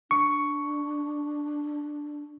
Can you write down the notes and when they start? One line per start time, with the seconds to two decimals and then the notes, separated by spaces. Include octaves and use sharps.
0.11 D4 C#6